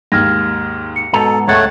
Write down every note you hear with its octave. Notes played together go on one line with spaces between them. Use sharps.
D#2 G#2 F6 G#6 A#6
C#7
G#2 B2 B3 A4 A#5
C#2 A3 C#5 F#5 A6